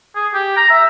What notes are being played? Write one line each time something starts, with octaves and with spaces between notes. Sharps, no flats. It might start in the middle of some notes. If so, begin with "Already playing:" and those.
G#4
G4
A#5
E5